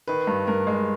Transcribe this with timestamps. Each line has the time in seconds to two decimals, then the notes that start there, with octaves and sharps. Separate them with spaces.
0.08 D#3 B4
0.27 G2
0.47 G2 A#4
0.67 G#3